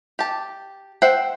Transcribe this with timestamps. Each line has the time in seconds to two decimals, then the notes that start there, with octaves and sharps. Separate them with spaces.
0.19 G4 A5
1.02 C5 E5 F#5 G5